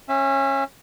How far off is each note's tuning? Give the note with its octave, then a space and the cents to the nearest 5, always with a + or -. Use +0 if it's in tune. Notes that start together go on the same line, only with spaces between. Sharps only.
C#4 -25 E5 +0